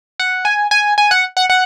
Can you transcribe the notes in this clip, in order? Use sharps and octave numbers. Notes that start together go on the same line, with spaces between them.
F#5
G#5
G#5
G#5
F#5
F#5
F#5